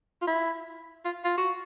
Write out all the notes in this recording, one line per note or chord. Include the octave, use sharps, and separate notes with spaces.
F4
E4
F4
F4
F#4